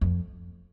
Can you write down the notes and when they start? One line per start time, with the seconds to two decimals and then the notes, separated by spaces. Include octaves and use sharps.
0.01 F2